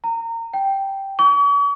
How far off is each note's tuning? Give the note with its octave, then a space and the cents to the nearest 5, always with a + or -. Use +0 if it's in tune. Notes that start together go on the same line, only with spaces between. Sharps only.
A#5 -25
G5 -5
C#6 +45